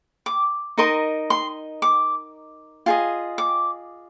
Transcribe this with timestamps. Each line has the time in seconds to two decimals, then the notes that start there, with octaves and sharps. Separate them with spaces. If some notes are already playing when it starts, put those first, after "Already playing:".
0.26 D6
0.78 D#4 A#4 D#5 C6
1.30 C6
1.82 D6
2.86 F4 G#4 D#5
3.38 D6